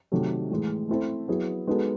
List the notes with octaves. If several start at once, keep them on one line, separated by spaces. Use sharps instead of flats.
C3 D#3 F#3 A3
A2 E3 G#3
A3 C4 E4 A4 C5
F#3 B3 E4 G#4
G#3 B3 D#4 F#4 A4